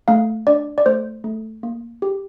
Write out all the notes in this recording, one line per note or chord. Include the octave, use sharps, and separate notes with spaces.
A3 F5
D4 D5
D5
A3 C5
A3
A#3
G4